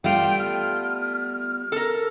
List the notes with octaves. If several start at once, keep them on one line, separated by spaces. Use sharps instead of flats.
G3 A3 B3 F4 G5
F6
A4 A#4